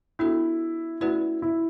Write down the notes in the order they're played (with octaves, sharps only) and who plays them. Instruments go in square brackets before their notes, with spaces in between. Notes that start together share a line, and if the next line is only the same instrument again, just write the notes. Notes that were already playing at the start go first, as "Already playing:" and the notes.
[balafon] B3 D4 F#4 A4 [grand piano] E4
[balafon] A3 C#4 F#4 B4 D5 [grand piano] E4
[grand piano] E4